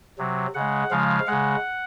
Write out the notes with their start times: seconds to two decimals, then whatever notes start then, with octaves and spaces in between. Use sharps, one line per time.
0.18 C3 F#3
0.55 C#3 G#3 F#5
0.91 C#3 F3 G#3 F5
1.27 C#3 G#3 F#5